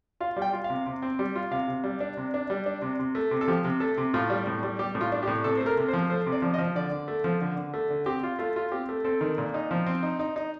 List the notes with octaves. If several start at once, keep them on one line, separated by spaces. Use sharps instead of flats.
F4 F5
G3
G5
F4
F5
C3
C3
C4
G3
F4
C3 F5
C3
G3
D4
C3
D4
G3
D4
C3
C3
A3
C3
A4
F3 G4
C3
A3 A4
C3
A2 F4
G3
A2
G3
G3 G4
A2
F4
D4
G4
A2
C3 A4
A3 C5
A#4
C3
C5
F3
A3 C5
C3
D5
F3
D#5
F3
D3 D5
D3
A3
F3
D3
D3
A3
D3
C4 G4
F4
A3 F4
F4
C4 G4
A3
C4 A4
D#3
A#2
D#4
F3
C4
D#4
D#4
D#4